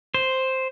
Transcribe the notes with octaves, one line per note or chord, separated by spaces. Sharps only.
C5